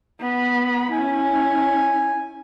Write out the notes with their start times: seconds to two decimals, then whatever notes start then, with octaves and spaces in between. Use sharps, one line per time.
0.20 B3 B5
0.92 C#4 E4 G#5